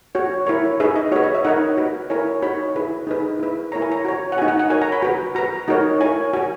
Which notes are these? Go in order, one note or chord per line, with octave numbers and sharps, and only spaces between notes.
F#4 C#5
E4 A#4 C#5
D#4 G#4 B4 E5
D#5
F#4 B4 C#5
D#5
E5
D#4 A#4 C#5 F#5
F#4 B4
E4 A#4 C#5 G#5
D#4 F#4 C#5 B5
E4 G#4 B4
D#4 G#4 B4
E4 B4
E4 A#4 C#5 A#5
G#5
A#5
F#4 C#5
F#5
D#4 F#4 B4 G#5
F#5
F#5
F#4 A#4 C#5 G#5
A#5
B5
F#4 B4
F#4 B4 A#5
D#4 F#4 A#4 C#5
E4 A#4 C#5 G#5
F#4 C#5 G#5